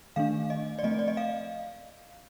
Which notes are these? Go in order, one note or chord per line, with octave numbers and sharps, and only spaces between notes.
D#3 A3 D4 F5
D#5
D5
F3 A3 C4 D#5
D5
D#5
F5